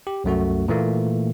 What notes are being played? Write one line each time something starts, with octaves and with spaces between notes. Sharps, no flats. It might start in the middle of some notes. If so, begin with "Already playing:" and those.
G4
C2 F#2 A3 F#4
A#2 E3 A3 A#3